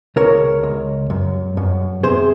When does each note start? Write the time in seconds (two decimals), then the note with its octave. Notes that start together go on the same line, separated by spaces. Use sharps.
0.16 C#2 A#4 C#5
0.63 C#2
1.10 F#2
1.57 F#2
2.03 C3 G#4 C5